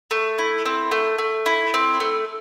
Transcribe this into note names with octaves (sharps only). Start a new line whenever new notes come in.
A3
E4
C4
A3
A3
E4
C4
A3